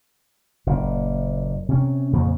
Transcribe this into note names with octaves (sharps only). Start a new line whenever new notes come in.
F#1 A#2
C3 C#4
F2 A#2 C#3 F3